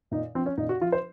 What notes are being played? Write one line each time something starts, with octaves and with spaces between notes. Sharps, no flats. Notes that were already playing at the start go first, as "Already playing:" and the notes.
A#2 D#4
F3 C4
C#4
A#2 D#4
F#4
F3 F4
C5